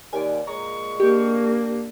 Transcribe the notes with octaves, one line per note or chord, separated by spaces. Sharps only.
D#2 D5 G#5
A#2 G#3 A#5 C#6
A#3 D4 G4